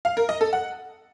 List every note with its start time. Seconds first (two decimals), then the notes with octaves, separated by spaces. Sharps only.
0.05 F5
0.17 A#4
0.29 D#5
0.41 A4
0.53 F#5